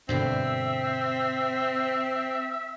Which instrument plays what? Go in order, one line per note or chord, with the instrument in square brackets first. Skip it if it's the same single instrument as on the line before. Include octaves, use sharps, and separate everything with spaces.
[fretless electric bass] G2 B2 D3 [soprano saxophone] C4 [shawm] E5